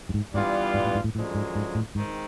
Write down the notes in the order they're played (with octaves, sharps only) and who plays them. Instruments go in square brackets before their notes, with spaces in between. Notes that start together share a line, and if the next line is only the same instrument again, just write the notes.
[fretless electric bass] G2
G#2
[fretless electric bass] G#2 [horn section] E3 G3 B3 D4 F4
[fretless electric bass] G#2
A2
G#2
A2
[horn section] F#2 D3 F3 G#3 [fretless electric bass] A2
[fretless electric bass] G#2
G#2
A2
[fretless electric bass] G#2 [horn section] D#3 G#3 C4